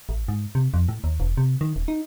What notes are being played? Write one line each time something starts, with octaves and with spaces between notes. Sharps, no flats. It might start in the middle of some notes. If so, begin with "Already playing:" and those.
A1
G#2
C3
F2
A2
D#2
E1
C3
D#3
D#1
D#4